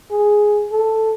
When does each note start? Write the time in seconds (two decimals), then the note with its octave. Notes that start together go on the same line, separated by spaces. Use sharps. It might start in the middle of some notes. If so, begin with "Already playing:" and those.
0.11 G#4
0.72 A4